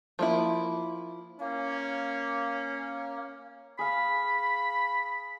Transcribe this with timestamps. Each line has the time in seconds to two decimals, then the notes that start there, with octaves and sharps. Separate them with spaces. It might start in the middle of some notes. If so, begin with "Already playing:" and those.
0.19 F3 A#3 E4
1.40 A#3 C#4
3.79 G#4 F5 B5